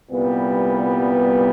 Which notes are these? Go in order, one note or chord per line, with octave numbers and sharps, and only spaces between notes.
C2 A#2 G3 B3